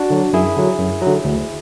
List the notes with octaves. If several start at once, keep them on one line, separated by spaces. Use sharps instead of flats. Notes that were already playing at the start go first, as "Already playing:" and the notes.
Already playing: D4 F#4
D3 F#3
F#2 E4 G#4
D3 F#3
F#2
D3 F#3
D2